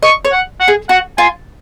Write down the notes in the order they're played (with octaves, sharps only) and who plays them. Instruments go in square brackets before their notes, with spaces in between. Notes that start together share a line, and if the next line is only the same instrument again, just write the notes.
[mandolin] D#5 [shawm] C#6
[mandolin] C#5
[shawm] F#5
F#5
[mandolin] G#4
[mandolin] F#4 [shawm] F#5
[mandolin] F4 [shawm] G#5